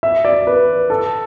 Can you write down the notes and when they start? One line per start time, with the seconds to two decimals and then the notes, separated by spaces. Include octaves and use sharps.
0.03 E5
0.25 D5
0.47 B4
0.90 A4